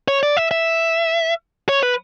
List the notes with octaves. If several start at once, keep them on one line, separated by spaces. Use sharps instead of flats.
C#5
D5
E5
E5
C#5
B4